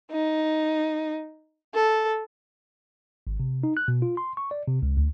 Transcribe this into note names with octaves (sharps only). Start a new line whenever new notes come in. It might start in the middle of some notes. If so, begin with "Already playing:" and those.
D#4
A4
G#1
C3
D#4
F#6
B2
F4
C6
C#6
D5
C3
C#2
D2